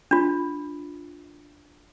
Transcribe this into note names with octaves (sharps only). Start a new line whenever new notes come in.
D4 F4